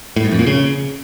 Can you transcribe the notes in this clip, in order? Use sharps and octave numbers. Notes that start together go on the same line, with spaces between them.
A2
G#2
F2
A#2
C#3